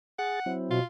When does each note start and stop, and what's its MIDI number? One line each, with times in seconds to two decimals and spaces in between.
0.19 0.40 68
0.19 0.52 78
0.19 0.40 93
0.46 0.80 54
0.46 0.80 60
0.46 0.80 64
0.71 0.81 47
0.71 0.85 65